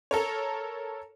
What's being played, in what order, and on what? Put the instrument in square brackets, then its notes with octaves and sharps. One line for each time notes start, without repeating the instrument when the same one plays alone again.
[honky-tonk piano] A4 A#4 C#5